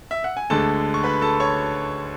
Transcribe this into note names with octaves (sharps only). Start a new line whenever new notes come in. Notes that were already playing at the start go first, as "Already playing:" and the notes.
E5
F#5
G#5
D2 D3 G#3 A4 A5
C#6
B4 B5
A4 A5
C#5 C#6